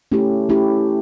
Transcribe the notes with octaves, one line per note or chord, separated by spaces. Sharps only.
A3 C#4 E4 G4
A3 C#4 E4 G4